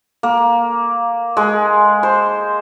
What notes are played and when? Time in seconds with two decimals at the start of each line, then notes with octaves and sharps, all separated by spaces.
0.23 A#3
1.37 G#3
2.03 C5